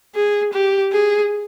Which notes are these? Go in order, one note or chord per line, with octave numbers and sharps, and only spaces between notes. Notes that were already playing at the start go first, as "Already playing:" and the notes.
G#4
G4
G#4